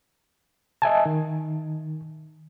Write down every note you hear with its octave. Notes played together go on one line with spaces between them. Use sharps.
D#5 E5 G#5 A5
D#3